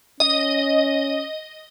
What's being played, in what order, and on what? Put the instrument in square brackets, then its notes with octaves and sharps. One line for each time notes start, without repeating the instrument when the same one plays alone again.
[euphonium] C#4 [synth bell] D#5